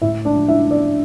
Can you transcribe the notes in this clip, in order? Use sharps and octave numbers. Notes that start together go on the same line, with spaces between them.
A2 E4 E5
D4 D5
F3
E4 E5
F3
D4 D5